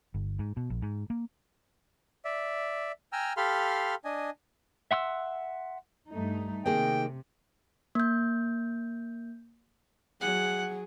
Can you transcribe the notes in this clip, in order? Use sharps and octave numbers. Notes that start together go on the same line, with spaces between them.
G1
G#2
B2
A#1
G#2
A#3
D5 E5
G5 G#5 A#5 E6 F6
G4 A4 F5 B5 C6 F6
D4 D#5 G#5
E5 F#5 C6 E6
G2 A3 D#4
C3 D#3 A#3 G#4 G5
A#3 G6
F#3 G#4 F#5